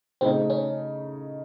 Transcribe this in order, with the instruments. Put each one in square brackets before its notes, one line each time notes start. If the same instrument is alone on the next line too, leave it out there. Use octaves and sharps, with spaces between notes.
[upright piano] C#3 A3 D#4 [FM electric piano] C4
[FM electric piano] C#4